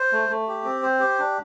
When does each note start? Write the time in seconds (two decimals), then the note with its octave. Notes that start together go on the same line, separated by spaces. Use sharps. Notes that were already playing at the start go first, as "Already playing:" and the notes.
Already playing: C5
0.12 A3
0.29 A3
0.47 G4
0.64 C4
0.83 C5
1.00 G4
1.18 D4